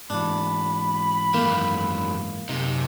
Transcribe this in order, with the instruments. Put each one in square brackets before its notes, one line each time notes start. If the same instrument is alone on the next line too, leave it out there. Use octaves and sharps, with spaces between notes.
[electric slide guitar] G#2 E3 [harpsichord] D4 [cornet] B5
[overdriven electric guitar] F#2 D#3 [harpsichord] A#3
[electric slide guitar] F#2 D#4 [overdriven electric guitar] C3